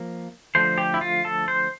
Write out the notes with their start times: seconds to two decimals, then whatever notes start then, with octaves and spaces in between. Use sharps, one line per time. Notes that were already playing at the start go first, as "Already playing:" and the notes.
Already playing: F3 A#3
0.55 D3 F3 A3 C5
0.78 G4
0.94 E4
1.01 F4
1.25 A4
1.48 C5